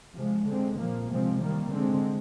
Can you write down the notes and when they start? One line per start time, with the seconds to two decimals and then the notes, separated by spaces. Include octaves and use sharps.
0.14 C3 F3 G#3
0.45 D3 G#3 C4
0.77 A#2 F3 A#3
1.09 C3 F3 G#3 C4
1.40 D#3 G3 A#3
1.72 D3 G#3 C4